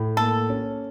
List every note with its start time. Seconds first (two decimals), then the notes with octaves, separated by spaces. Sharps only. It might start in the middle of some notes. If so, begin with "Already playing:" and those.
Already playing: A2
0.17 A#3 A4
0.50 C#4